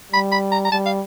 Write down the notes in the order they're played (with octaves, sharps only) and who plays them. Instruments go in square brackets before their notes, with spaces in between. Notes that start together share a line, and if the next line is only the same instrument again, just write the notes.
[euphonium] G3 [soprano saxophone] B5
[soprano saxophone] B5
A#5
A#5
[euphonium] G3 [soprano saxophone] A5
[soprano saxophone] F5